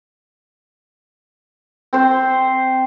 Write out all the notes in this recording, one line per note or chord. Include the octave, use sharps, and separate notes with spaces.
C4 C5